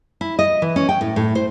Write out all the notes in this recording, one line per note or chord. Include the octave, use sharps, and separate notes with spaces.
E4
D#5
E3
C#4
G5
A2
A2
C5